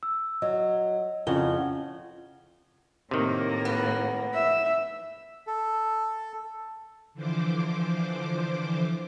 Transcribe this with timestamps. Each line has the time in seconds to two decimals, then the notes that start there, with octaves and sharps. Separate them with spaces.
0.03 E6
0.42 F#3 D#5
1.27 F2 C#3 E4 F#5 G7
3.11 A2 C3 D#3 A#3
3.65 B3
4.34 E5
5.47 A4
7.14 D3 E3 F3 C5 D6